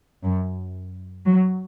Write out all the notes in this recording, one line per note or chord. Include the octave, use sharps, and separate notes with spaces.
F#2
F#3